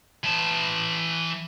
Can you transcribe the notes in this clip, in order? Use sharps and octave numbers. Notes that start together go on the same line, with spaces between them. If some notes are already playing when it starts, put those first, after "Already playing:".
E3 A5